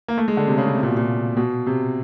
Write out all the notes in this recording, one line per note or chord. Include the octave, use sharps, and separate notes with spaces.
A#3
A3
G#3
D3
C3
C#3
C3
C3
A#2
B2
A#2
B2
C3